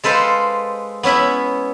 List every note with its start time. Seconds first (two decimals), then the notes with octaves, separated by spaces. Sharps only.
0.04 G#3 A4 B4 C5 F5
1.03 B3 C#4 E4 E5 B5